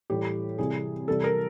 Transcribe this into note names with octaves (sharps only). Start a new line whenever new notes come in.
A2 E3 G3 G4
C3 E3 G3 G#4
C3 E3 G3 A4
A#4